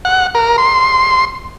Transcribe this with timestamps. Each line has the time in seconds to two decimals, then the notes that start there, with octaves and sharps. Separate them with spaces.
0.05 F#5
0.35 A#4
0.58 C6